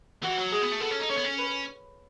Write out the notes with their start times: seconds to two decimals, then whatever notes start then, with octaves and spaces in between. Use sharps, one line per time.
0.22 E3 F#4
0.37 F#3
0.51 G#3 G#4
0.61 B3
0.72 A3
0.80 B3 A4
0.91 C#4
1.00 D#4
1.09 C#4 C#5
1.17 B3
1.24 C#4
1.39 B4